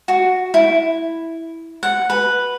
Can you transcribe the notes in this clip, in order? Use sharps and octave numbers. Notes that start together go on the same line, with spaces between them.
F#4
E4
F#5
B4